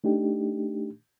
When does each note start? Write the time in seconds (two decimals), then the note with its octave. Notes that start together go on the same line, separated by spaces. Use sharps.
0.04 A3 D4 D#4 G4